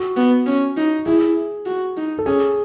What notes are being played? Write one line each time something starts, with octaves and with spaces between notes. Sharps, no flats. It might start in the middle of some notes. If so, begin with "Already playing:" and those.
Already playing: F#4
B3
C#4
D#4
E4 G#4
F#4
D#4
A4
C#4 G#4